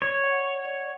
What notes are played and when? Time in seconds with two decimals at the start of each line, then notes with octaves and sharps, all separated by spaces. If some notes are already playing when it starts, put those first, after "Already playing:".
0.01 C#5 D5
0.23 F#5
0.44 D5
0.65 D5